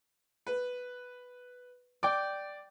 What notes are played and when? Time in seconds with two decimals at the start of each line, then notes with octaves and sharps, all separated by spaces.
0.47 B4
2.03 D5 G5 D6